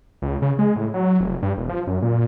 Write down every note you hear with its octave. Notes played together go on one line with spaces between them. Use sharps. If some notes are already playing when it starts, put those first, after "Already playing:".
C#2
C#3
G#3
A2
F#3
F1
G2
E1
F3
F#2
A#2